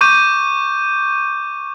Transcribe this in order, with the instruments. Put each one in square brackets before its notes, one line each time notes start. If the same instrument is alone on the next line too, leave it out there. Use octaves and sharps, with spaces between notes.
[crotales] C#6 D6 G6 D#7